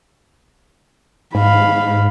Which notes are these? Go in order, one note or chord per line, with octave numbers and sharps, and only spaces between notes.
G#2 F5 B5